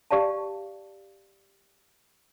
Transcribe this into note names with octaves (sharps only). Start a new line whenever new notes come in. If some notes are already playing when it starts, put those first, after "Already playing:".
G4 D5 F5 A5